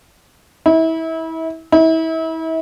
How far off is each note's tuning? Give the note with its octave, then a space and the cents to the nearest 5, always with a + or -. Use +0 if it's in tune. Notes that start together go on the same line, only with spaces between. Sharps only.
E4 -30
E4 -35